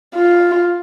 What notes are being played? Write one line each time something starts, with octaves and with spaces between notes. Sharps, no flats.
F4